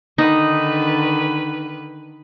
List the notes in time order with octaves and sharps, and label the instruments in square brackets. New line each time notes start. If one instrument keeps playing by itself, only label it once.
[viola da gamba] D3 D#3 B4 [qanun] D#4